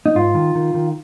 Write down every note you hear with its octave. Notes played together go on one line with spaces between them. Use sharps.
D#4
G#2 F4
D#3
D#3
D#3